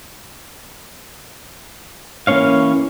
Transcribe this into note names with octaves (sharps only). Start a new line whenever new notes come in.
E3 A#3 C#4 C#5 F5